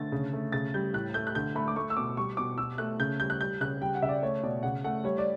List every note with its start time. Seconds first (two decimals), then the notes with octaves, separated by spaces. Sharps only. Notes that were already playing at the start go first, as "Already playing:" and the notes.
Already playing: D3 A3 A6
0.12 C#3
0.33 A3
0.52 C#3 A6
0.74 G3 G6
0.93 A2 F#6
1.14 A3 G6
1.27 F#6
1.35 D3 G6
1.55 A3 B5
1.68 D6
1.76 A3 C#6
1.90 E6
1.97 B2 D6
2.17 G3 C#6
2.37 B2 D6
2.58 B2 E6
2.78 A3 F#6
3.00 C#3 G6
3.20 G3 G6
3.30 F#6
3.41 G3 G6
3.61 C#3 F#6
3.81 G3 G5
3.95 F#5
4.02 C#3 E5
4.09 D5
4.22 A3 C#5
4.43 B2 D5
4.63 C#3 F#5
4.84 A3 F#5
5.04 G3 C#5
5.18 D5